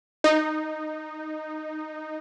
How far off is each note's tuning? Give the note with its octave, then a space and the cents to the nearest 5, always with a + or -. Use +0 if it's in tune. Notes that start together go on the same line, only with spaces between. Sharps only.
D#4 -10